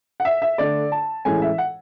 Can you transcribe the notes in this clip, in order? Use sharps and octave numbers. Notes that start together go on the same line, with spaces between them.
F#5
E5
E5
D3 A3 D4 D5
A5
A2 E3 G#3 C#4 G#5
E5
F#5